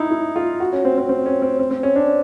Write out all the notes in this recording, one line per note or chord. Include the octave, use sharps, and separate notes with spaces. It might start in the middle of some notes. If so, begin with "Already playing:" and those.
Already playing: D#4 E4
E4
F4
F#4
C#4
C4
C4
C4
C#4
C4
C4
C4
C#4
D4